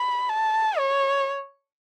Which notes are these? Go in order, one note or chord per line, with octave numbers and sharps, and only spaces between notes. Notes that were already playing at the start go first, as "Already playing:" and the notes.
Already playing: B5
A5
C#5